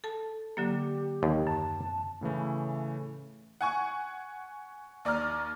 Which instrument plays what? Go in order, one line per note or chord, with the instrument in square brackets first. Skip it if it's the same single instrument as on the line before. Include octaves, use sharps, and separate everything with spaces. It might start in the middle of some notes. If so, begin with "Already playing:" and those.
[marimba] A4 A5
[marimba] D3 F#3 A#3 [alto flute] G4
[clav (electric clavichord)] D#2
[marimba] F#2 [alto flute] A5
[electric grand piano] A2 C#3 E3 A3
[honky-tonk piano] F#5 G#5 C#6
D#2 D5 A#5 F6